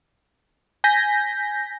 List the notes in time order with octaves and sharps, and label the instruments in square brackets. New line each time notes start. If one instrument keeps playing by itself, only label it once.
[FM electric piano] G#5 G6 A#6 B6